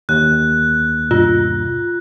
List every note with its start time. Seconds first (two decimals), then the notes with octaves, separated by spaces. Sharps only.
0.09 D#2 F#6
1.11 G2 B2 F4